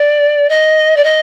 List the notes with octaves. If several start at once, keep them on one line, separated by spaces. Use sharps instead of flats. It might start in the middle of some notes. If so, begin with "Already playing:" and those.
Already playing: D5
D#5
D5
D#5